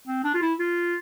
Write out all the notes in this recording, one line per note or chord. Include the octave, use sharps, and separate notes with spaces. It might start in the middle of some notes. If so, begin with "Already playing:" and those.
C4
D4
F4
E4
F4